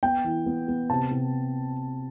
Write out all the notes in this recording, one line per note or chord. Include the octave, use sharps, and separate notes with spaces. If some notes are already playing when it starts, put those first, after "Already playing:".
B3 G5
E3
B3
B3
C3 A5
C3